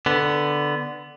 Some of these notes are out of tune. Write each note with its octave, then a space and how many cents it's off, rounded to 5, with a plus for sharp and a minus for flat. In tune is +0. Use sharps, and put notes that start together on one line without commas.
D3 +0 B3 +0